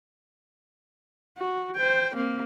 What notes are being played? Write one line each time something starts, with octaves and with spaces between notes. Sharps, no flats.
F#4
C5 G5
A#3 C4